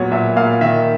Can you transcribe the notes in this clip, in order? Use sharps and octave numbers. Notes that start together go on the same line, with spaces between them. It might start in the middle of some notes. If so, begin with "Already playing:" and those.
Already playing: A#2 F#3 B3 C#5
A#2 E5
A#2 F5
D#3 E5